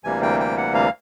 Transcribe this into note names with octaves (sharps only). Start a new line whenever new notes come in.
D2 C3 E3 G3 A#3 G#5
G5
G5
F#5
F5